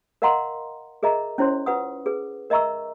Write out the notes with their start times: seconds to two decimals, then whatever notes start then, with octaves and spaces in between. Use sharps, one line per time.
0.22 A#4 D#5 F5 F#5 A#5 C6
1.03 G#4 A#4 D#5 E5 A#5
1.38 C#4 E4 C5 C#5 C6
1.66 F4 B4 F#5 D#6
2.06 G#4 B4
2.50 A#4 D#5 E5 A#5 C#6 E6